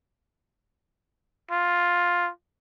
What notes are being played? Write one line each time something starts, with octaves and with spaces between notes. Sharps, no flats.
F4